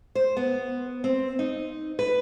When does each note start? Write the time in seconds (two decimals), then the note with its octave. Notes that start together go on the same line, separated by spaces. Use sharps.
0.15 C5
0.37 B3
1.04 C4
1.39 D#4
1.99 B4